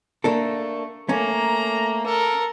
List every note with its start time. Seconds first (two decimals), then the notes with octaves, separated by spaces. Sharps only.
0.24 A3 A#3 D4 A4
1.09 A3 A#3 C#4 A#5
2.06 A4 A#4